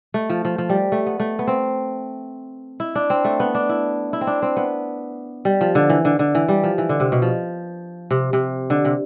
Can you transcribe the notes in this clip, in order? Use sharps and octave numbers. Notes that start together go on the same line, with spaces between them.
A3
F3
F3
F3
G3
A3
B3
A3
B3
C4
E4
D4
C4
A3
B3
D4
E4
E4
C4
D4
C4
B3
G3
F3
D3
E3
D3
D3
E3
G3
F3
E3
D3
C3
B2
F3
C3
C3
D3
C3